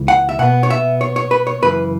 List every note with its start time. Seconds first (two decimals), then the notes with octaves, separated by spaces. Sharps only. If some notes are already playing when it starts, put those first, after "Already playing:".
Already playing: C#2 C#3 E3
0.08 F#5
0.29 E5
0.39 B2 B3 F#5
0.63 C#5
0.70 E5
1.01 C#5
1.16 C#5
1.31 B4
1.47 C#5
1.62 F#2 C#3 E3 B4